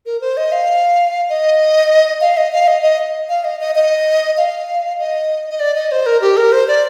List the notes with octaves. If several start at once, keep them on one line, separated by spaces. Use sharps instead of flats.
A#4
C5
D#5
F5
D#5
F5
D#5
F5
D#5
D#5
F5
D#5
D#5
D#5
F5
D#5
D#5
D5
D#5
C5
A#4
G4
A#4
C5
D5